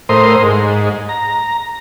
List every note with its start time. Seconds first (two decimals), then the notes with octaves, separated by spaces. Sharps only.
0.09 A2 A#4 C5 C6 D#6
0.43 G#2
1.09 A#5